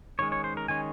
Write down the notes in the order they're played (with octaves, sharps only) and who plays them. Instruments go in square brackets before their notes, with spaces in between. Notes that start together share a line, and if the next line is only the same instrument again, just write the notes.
[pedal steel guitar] D#3 G#3 C#4 C#5
C#5
C5
A#4
D#3 G#3 C#4 G#5